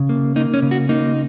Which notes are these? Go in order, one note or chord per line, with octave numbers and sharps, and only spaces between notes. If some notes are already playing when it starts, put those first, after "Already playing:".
Already playing: C#3
A#3
A#3 D#4
C#4
C#3
F#4
A#3 D#4